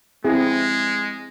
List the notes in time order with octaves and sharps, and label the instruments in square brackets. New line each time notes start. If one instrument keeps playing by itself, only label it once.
[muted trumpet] G#3 [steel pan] C4 E4 G#4